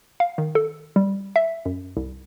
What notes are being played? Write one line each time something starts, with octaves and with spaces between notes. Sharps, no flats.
F5
D#3
A4
G3
E5
F#2
C2